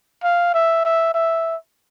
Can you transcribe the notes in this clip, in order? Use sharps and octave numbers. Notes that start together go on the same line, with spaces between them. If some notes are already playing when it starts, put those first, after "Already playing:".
F5
E5
E5
E5